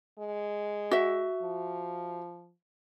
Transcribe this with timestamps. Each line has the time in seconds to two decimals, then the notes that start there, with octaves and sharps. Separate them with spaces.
0.19 G#3
0.91 F#4 E5
1.42 F3